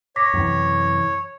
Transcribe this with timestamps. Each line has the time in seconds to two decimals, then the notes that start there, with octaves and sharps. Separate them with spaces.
0.16 C#5 D6 A#6 B6
0.34 F#2 C3 E3